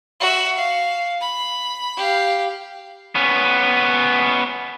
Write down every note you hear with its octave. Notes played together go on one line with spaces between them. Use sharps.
F#4 E5
F5
B5
G4 F5
B3 C#4